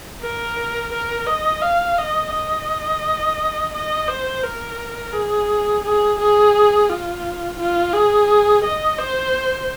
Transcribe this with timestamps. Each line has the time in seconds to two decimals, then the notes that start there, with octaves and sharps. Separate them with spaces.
0.22 A#4
0.93 A#4
1.27 D#5
1.62 F5
1.98 D#5
2.33 D#5
3.74 D#5
4.08 C5
4.43 A#4
5.13 G#4
5.84 G#4
6.19 G#4
6.89 F4
7.59 F4
7.93 G#4
8.64 D#5
8.99 C5